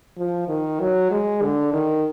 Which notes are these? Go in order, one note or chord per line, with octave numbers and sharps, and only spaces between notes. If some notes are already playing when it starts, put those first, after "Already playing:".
F3
D#3
F#3
G#3
D3
D#3